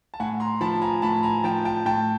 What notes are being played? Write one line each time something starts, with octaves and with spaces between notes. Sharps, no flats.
A5
A2 F#5 G#5
A#5 C6
F3 A5 B5
G#5 A#5
A2 A5 B5
G#5 A#5
F3 G5 A5
G5 A5
A2 G5 A5